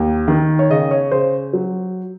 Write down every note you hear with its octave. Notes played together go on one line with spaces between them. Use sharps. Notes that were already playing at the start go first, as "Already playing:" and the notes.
Already playing: D#2
D#3
C#5
C#3 D#5
C#5
C#3 C5
F#3